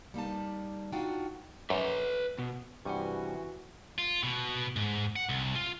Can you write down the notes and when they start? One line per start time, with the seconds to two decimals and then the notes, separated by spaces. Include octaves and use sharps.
0.14 G3 A#3 D#4 A5
0.93 D4 D#4 F4 F#4 G5
1.70 F#2 B4 C#5
2.39 B2
2.85 G2 C3 E3 G3 F#4 F#5 G#5 C#6
3.99 F4
4.23 B2
4.76 G#2
5.16 F#5
5.29 C2
5.55 F4